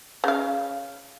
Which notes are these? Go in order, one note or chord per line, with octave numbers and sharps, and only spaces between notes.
C#3 F5